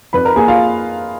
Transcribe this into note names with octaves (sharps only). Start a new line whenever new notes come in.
F2 B4 B5
A#4 A#5
A#3 G#4 G#5
F4 F5